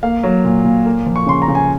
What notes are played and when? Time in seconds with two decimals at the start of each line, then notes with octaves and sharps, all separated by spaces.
0.03 A#3 F5
0.23 F#3
0.44 A#2
0.65 A#2
0.86 A#3
1.06 F3
1.16 C#6
1.26 C#3 C6
1.42 A#5
1.48 C#3
1.55 G#5